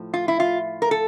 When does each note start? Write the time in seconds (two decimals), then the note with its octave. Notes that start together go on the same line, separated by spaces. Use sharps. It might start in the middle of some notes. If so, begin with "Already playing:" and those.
Already playing: A2 F3
0.14 F4
0.28 E4
0.40 F4
0.82 A#4
0.91 A4